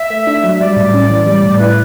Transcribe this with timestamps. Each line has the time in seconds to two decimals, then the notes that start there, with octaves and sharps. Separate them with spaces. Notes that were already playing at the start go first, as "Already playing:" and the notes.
Already playing: E5
0.10 A3
0.27 D4
0.44 F#3
0.49 E5
0.60 G3 D5
0.77 A2
0.94 C#4
1.10 E3
1.26 G3
1.43 A2
1.60 E4 B4